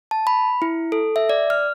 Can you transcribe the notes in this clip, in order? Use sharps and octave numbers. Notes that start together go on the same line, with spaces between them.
A5
B5
E4
A4
E5
D5
F6